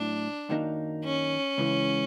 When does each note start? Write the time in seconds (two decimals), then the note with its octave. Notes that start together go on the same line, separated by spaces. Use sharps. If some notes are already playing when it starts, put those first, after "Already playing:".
Already playing: A2 F#3 D4
0.49 F#2 D#3 F#3 A#3 D#4
1.04 C#4
1.58 C#2 C#3 E3